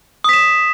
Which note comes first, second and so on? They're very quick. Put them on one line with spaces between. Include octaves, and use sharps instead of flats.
D#6 B6 E7